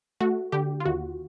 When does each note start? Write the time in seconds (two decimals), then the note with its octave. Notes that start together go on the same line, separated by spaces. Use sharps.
0.20 A3 F#4
0.52 D3 G4
0.80 F4
0.86 D#2 F#4